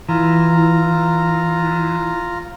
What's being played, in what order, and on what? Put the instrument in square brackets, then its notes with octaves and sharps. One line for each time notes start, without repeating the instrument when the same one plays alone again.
[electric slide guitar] E3 [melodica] F4 A#5